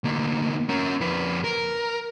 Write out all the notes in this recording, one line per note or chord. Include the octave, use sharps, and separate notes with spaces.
D2 A#3
C#4 A#4
F2 B4
A#4